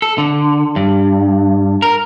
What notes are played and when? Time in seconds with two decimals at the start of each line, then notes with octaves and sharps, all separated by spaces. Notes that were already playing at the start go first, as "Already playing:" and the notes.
0.02 A4
0.18 D3
0.76 G2
1.82 A#4